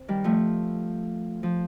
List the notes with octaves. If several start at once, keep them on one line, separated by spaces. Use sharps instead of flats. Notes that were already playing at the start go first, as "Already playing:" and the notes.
Already playing: C4
D#3 G3
F3 A3
F3